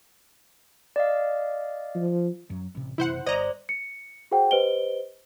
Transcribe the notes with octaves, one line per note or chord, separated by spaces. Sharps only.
D5 D#5 F5
F3
F#2 F#3
A1 C3
F#1 C3 E3 E4 C5 F#5
G1 C5 D5 D#5 A#5
C#7
F#4 G#4 C5 F#5 G5
G4 B4 C5 D#5 D7 G7